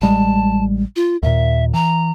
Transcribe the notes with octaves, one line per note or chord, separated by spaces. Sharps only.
A1 G3 G#3 A5
F4
D#2 A#2 E5
E3 A#5